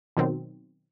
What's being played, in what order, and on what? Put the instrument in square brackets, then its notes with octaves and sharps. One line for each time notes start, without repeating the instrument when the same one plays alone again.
[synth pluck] B2 D#3 F#3 C4